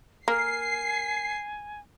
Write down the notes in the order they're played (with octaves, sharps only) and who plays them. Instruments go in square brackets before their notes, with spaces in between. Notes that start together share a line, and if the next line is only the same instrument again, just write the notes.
[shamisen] A#3 [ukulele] A#4 [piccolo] G#5 [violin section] C7